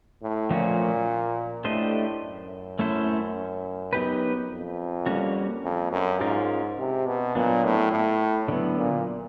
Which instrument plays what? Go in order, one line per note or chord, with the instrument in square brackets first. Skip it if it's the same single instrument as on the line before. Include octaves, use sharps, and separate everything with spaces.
[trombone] A2
[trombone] A#2 [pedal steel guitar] F3 A3 C#4 F#4
[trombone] A2 [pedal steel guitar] A3 D4 G4 C5 D#5
[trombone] F#2
[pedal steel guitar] A3 C#4 E4 A4 C5
F#3 B3 D#4 G4 B4
[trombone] F2
[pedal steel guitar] G3 A#3 C#4 F#4
[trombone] F2
F#2
[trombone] G#2 [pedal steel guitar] C#4 F4 A#4
[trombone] C3
B2
[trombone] A#2 [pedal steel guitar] F#3 B3 D4
[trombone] A2
A2
[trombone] A2 [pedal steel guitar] D3 F#3 B3
[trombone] A#2